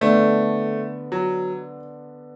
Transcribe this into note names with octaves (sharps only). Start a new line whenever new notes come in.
D3 A3 B3 D4
F#3